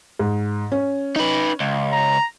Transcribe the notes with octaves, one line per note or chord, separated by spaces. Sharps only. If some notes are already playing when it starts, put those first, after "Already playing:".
G#2
C#4
D#4 B4
C#2
A#5